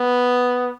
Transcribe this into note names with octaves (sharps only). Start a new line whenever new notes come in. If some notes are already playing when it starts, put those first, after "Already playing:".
Already playing: B3